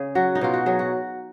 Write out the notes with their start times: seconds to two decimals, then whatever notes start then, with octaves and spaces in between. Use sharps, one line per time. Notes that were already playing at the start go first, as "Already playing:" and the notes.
Already playing: C#3 G#4
0.15 F#3 F#4
0.35 D#4
0.41 B2 F4
0.53 F#4
0.66 F#3 G#4
0.79 F#4